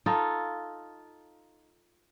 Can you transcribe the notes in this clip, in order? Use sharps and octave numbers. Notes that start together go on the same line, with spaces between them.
D#4 F4 A4